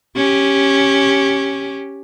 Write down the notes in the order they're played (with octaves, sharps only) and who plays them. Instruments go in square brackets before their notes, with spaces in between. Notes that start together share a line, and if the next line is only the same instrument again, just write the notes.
[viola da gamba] C#4 G4